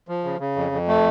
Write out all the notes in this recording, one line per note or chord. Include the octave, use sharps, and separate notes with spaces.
F3
C#3
C#3
F2
F2
A3